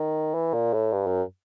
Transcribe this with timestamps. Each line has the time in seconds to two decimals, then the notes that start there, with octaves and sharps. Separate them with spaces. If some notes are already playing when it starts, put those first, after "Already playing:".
Already playing: D#3
0.34 E3
0.54 A#2
0.73 A2
0.92 G2
1.07 F#2